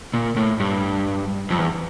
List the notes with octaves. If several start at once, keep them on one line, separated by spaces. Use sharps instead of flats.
A#2
A2
G2
F2
E2